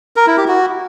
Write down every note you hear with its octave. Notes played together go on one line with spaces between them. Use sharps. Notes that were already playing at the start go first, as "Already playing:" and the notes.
A#4
E4
G4
F#4